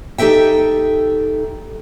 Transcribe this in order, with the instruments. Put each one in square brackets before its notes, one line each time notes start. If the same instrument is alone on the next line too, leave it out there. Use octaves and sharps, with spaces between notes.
[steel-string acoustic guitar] D#4 G4 A4 E5 G5